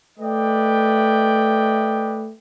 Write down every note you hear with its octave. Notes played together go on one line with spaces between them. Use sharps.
A3 B4 D5 D#5 G5